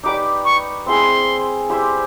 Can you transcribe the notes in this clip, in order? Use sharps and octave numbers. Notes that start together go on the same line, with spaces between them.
D#4 G4 B4 D5 D6
C#6
C4 E4 G#4 C6
E4 G4 C5 E5